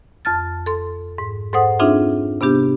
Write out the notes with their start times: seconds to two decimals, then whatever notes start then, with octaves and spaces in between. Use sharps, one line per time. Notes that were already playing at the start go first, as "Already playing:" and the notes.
0.25 F2 A5 F6 A6
0.66 A4 C6
1.18 G#2
1.53 G#2 A4 C5 F#5 D#6
1.79 C4 D4 D#4 F4 G#4 E5
2.41 C3 B3 D4 G4